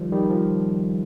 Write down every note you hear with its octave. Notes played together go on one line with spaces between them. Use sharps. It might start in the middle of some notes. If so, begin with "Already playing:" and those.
Already playing: D#3 F3 G3
D#3 G3
F3